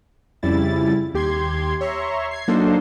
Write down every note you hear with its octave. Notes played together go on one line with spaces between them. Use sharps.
F2 C#3 G3 E4 A6
D#2 G4 C6 G#6
C#5 E5 A#5 C6 C#6
G#6 C7
F#3 A#3 D4 D#4 A4 C5